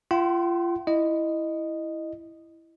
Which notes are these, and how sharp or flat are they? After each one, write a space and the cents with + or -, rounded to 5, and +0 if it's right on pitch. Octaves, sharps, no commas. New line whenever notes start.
F4 -30 G5 -45 C6 +10
E4 +0 D#5 -10